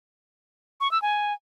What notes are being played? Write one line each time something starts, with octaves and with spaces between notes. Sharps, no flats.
C#6
E6
G#5